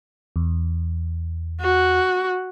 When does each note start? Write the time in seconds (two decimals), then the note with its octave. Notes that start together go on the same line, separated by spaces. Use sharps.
0.36 E2
1.61 F#4